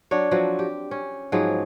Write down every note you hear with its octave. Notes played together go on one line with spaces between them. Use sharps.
F#3 D4 C#5
F3 F#3 C4 F#4
G4
C#4
G#2 F3 F#3 G#4